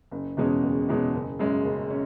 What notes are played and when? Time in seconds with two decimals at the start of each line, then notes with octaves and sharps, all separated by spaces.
0.11 F#1
0.37 E2 B2 G#3 C#4
0.63 F#1
0.89 E2 B2 G#3 C#4
1.14 F#1
1.39 F#2 C#3 G#3 C#4
1.65 F#1
1.90 C#4